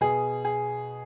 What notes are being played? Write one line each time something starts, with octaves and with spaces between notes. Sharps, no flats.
B2 G#4
G#4